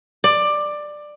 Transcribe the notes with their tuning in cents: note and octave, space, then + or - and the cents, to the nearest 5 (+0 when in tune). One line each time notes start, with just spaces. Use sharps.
D5 +15